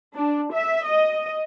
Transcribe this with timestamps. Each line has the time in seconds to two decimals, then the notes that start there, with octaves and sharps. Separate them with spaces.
0.15 D4
0.51 E5
0.85 D#5